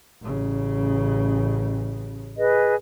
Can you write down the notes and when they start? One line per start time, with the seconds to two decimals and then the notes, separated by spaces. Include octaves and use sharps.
0.22 A1 C#3
2.37 G#4 B4 D#5